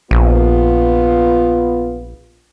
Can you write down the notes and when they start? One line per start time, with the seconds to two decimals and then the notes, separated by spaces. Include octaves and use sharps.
0.11 A#1 B3 F4